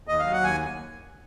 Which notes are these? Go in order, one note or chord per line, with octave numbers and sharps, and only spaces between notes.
D#2 D#5
F#3 F5
F#5
D#2 G#5